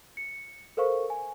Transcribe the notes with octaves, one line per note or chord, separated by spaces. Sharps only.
C#7
A4 A#4 C5 F5 C#6
G#5